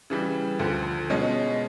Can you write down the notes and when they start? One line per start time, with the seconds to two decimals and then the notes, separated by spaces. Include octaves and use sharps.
0.10 C#3 E3 G3
0.59 D2 D3 F3
1.10 B2 G#3 C#4